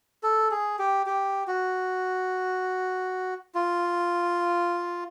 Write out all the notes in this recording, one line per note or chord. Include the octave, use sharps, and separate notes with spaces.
A4
G#4
G4
G4
F#4
F4